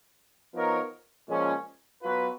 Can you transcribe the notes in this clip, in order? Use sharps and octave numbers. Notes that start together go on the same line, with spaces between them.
F3 B3 D#4 A#4 C#5
A#2 F3 G#3 C#4 G#4
F#3 B3 F4 B4